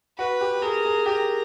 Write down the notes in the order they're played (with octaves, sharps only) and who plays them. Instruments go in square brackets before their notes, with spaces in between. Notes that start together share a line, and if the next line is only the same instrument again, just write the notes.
[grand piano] F#4 [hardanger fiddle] B4
[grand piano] G4
[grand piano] G#4 [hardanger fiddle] A#4
[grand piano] G#4
[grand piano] G4 [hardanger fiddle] A#4